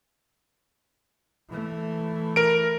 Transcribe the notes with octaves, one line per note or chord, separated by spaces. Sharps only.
E3 A3
A#4 D7